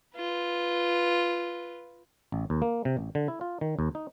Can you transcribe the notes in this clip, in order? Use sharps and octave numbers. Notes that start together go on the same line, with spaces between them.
F4 B4
A1
D#2
A#3
C3
A1
D3
E4
F4
D#3
D#2
D#4